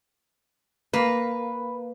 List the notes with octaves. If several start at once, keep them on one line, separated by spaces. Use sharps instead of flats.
A#3 B4